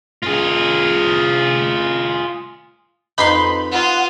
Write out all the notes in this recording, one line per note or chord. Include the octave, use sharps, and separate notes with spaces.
F4 G#4
F2 D#4 G4 B4 B5 C6
F4 F#5 D#6